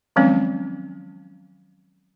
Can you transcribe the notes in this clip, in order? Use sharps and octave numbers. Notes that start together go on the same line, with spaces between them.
D#3 F3 F#3 G#3 C4 C#4